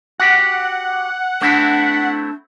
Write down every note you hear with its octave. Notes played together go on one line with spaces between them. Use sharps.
F#4 G4 F#5
A3 C4 D4 E4